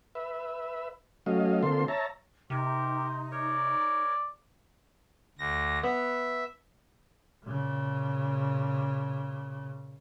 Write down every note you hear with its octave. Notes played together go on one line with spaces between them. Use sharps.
B4 E5
F#3 A3 C#4 D#5 F5
D3 A#3 C4 F4 A4 C6
C#5 E5 A5 A#5
C3 D#4 G4 A#4 C5
A#4 C#5 D5
D2 A#6
B3 E5
A#2 C#3